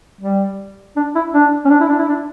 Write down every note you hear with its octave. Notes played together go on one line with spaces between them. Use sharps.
G3
D4
E4
D4
C#4
D4
E4
D4
E4
D4